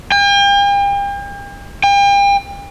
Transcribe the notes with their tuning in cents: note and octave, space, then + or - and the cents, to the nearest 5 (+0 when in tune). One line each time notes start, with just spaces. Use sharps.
G5 +40
G5 +40